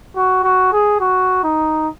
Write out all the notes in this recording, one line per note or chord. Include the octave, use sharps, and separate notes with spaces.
F#4
F#4
G#4
F#4
D#4